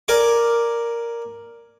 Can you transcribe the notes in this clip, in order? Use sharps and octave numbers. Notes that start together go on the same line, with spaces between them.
A#4 D5 G#5 D6